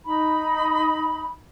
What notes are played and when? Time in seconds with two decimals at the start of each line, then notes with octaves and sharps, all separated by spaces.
0.04 D#4 B5